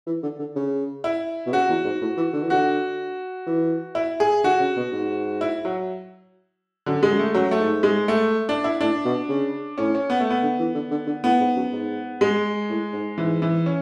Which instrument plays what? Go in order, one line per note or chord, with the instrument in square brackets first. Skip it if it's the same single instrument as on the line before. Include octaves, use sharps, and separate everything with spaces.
[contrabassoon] E3
D3
D3
C#3
[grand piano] E4
[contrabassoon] B2
[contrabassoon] C#3 [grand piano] F#4
[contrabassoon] E2
G#2
A2
E3
D3
E3
[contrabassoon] D3 [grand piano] F#4
[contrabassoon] E3
[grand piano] E4
G#4
[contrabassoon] D3 [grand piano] F#4
[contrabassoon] C#3
B2
G#2
[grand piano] E4
F#3
[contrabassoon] F#2 [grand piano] D3
[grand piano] G#3
[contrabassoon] F#2
[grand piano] A3
[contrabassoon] F#2 [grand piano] F#3
[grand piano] A3
[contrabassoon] G#2
[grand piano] G#3
A3
D4
E4
[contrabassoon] A2 [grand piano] D4
[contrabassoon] B2
C#3
[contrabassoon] A2 [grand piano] C#4
[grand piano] C#4
B3
A3
B3
[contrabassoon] D3
E3
D3
D3
D3
[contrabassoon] A2 [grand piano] B3
[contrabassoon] G#2
F#2
G#2
[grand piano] G#3
[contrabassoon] A2
G#2
[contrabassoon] G#2 [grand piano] E3
[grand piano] E3
C#4